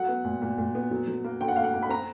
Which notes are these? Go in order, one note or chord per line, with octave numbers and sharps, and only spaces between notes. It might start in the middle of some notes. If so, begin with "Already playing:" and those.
Already playing: F#3 F#5
B3
A#2
A#2
A#2
B3
F#3
F#3
A#3
D3 G5
F#5
A#3 F5
F#5
A#3
B5
C4 A#5